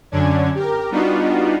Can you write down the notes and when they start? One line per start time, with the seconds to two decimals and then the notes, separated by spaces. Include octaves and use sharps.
0.12 F#2 D3 C#4 D4 G#6
0.55 G4 A#4
0.91 G3 B3 D4 D#4 F4 F#4